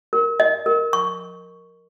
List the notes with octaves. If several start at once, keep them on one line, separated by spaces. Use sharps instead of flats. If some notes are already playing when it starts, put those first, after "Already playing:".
A#4
D#5
A#4
C#6